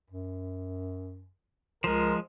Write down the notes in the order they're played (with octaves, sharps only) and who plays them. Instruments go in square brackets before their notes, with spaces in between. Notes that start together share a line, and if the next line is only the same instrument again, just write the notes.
[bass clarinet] F#2
[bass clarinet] C#2 [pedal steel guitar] F3 G#3 [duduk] A#4